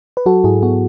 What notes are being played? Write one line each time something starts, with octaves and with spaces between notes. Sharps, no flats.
B4
F#3 F#4 A4
G#2 E4 G#4
B3 F#4